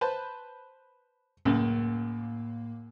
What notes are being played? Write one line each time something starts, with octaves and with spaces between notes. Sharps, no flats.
B4 C5 A5
C#2 F#2 A2 A#3